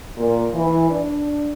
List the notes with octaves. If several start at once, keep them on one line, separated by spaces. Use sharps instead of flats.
A#2
E3
D4